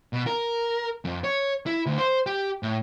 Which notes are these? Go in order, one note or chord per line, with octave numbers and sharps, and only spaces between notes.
B2
A#4
F2
C#5
E4
D2
C5
G4
A2